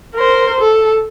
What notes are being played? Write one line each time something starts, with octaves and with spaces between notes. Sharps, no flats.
A#4 C5
A4